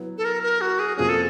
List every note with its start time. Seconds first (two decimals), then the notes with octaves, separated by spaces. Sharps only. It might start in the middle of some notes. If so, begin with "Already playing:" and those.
Already playing: F#3 B3 E4
0.18 A4
0.25 A#4
0.43 A#4
0.61 F#4
0.79 G#4
0.97 F2 C3 F3 A#3 C#4 G#4
1.09 A4